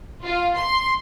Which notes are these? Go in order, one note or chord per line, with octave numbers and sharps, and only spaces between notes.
F4
C6